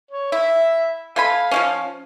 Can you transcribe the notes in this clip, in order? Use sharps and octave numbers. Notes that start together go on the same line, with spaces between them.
C#5
E4 E5
A3 F5 G#5 B5
F3 G#3 C#4